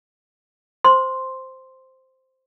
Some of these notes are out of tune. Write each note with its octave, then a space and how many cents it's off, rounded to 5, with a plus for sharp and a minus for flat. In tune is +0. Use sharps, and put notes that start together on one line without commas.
C5 -5 C6 +0